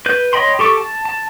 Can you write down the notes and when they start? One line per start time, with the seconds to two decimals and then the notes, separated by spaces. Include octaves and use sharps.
0.06 B4 G6
0.33 C#5 D#5 G5 B5 C6
0.59 G4 A4 C#6 D6
0.78 A5
1.05 A5